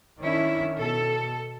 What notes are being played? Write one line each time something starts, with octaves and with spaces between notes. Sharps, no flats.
D#3 C#4 D4 E4
B2 A4